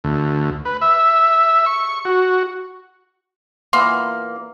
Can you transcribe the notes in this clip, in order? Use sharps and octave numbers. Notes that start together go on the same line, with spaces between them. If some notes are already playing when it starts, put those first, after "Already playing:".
D2
B4
E5
C#6
F#4
A#2 E3 A#3 B3 C6